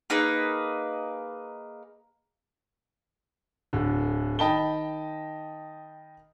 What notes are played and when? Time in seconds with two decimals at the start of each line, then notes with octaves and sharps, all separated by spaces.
0.10 A#3 D#4 G#4 B4
3.73 D1 D3
4.39 D#3 D#5 G5 A5 B5 G7